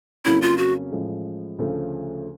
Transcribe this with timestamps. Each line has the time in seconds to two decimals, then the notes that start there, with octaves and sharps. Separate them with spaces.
0.25 F2 C#3 F#3 A#3 C#4 E4
0.42 F4
0.58 F#4
0.92 A1 A2 F3 G#3
1.59 D2 C#3 F3 A3